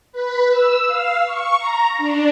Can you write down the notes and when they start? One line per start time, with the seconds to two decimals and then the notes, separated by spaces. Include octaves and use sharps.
0.12 B4
0.51 E6
0.87 F5
1.25 C#6
1.59 A#5
1.98 D4